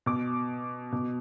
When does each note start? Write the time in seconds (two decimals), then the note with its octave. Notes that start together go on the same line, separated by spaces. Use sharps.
0.06 B2 D6
0.92 B2